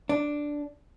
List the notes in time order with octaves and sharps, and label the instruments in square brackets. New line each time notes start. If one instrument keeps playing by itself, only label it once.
[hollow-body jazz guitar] D4